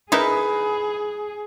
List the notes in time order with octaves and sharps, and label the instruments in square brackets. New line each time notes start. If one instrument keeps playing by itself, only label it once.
[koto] D#4 E4 A#4 [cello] G#4 [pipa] B4